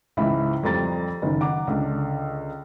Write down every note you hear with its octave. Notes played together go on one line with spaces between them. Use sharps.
C#2 G#2 E3 E5 B5
F2 G3 C5 A#5 A6
F#1 D#3
F#5 A#5 D6
C#2 D3